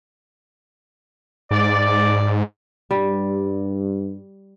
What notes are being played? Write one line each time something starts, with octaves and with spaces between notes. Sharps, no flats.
G#2 D5
G2 G3